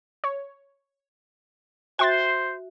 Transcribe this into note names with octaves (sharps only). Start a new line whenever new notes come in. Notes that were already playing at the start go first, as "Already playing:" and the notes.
C#5
F#4 C5 E5 G5 C6 A6